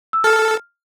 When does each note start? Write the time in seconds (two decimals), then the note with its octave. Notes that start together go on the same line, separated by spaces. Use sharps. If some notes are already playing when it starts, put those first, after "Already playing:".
0.13 E6
0.24 A4 F6